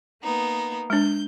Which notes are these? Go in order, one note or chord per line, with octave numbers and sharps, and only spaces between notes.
A#3 B3 D#4
G#3 D4 G6